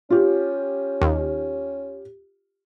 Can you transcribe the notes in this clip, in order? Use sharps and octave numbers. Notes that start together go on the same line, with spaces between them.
C#4 F4 G4
D#2